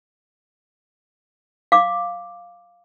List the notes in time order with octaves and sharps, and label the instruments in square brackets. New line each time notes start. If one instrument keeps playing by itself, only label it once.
[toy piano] F5 D6